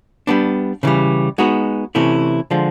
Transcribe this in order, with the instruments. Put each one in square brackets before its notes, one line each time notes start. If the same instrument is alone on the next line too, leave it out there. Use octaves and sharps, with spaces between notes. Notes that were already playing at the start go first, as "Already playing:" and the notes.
[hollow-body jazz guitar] G3 B3 D4
C#3 E3 G3
G#3 B3 D#4 F#4
C3 E3 A3 C#4 E4
D3 F3 G#3